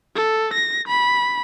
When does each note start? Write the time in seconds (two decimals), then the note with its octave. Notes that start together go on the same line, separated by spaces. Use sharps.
0.16 A4
0.54 A#6
0.88 B5